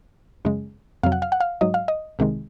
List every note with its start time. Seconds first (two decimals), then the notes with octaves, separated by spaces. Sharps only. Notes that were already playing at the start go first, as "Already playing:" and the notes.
0.45 F#2 C#3 G#3
1.03 F2 C3 F#3 F5
1.12 F#5
1.22 F5
1.32 F#5
1.40 F5
1.61 G#2 F#3 D#5
1.74 F5
1.88 D#5
2.19 C2 C3 D#3 G#3